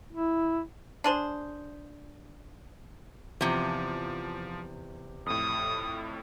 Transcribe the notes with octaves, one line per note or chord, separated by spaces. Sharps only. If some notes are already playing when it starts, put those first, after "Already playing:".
E4
D4 G#4 C5
E2 C3 F3
F2 A2 D#6